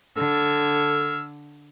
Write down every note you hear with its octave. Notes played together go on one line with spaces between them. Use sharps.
D3 A4 E6 F6 G#6